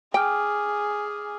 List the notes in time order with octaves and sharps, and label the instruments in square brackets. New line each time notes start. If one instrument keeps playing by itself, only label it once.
[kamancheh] G#4 [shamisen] G5 [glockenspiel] G#5 D6 F6